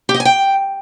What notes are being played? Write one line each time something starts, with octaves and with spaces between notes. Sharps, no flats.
G4
D#5
G#5
G5